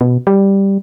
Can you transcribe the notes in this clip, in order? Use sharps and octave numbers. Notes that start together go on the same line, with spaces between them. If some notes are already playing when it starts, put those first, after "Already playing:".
B2
G3